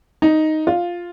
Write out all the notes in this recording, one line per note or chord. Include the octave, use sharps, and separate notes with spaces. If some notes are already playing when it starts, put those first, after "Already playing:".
D#4
F4